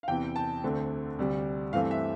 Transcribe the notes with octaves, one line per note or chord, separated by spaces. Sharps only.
F5
E2 C3 E3 G5
A5
D2 D3 A3 C4
D2 C3 G3
G2 E3 A3 C4 F5
E5